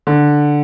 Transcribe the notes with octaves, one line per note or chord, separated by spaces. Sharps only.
D3